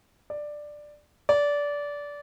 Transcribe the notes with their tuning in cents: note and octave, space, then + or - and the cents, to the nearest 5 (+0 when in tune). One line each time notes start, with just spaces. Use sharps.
D5 +10
D5 -20